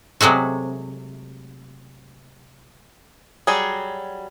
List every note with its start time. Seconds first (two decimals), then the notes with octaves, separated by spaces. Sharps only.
0.21 C3 F#3 G#3 A3 F#4
3.47 F#3 G3 F#4 G#4